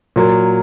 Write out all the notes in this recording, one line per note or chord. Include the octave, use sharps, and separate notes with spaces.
A#2 F#3 A#3